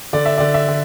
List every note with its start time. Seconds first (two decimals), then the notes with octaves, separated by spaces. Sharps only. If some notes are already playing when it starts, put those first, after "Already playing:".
0.13 D3 D5
0.26 E5
0.38 D3 D5
0.54 E5
0.68 D3